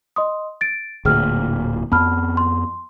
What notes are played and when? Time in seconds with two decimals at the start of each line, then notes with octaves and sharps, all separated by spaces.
0.16 D#5 C6 D#6
0.61 A6 D7
1.05 D1 D2 A#2 G#4 G5 F6
1.92 F2 B3 A5 B5 F6
2.37 C6